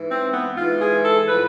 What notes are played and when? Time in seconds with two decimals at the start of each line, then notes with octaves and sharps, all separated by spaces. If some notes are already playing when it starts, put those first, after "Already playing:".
Already playing: G#2 E3
0.11 C4
0.34 B3
0.57 G#2 E3 F4
0.81 G#4
1.05 A4
1.28 A2 F3 B4